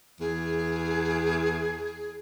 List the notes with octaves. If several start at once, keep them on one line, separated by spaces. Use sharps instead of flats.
E2 G#4